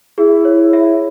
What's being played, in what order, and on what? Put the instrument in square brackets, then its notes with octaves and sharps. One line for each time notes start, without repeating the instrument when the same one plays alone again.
[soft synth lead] E4 [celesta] G#4
[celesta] C#5
E5